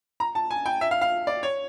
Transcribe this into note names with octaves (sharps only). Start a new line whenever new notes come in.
A#5
A5
G#5
G5
E5
F5
F5
D5
C#5